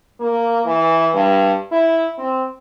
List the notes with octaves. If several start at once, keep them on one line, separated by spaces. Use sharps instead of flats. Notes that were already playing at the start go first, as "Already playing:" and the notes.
A#3
E3
G2
E4
C4